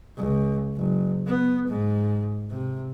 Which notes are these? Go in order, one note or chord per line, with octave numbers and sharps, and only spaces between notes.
C#2
F#1
B3
G#2
C3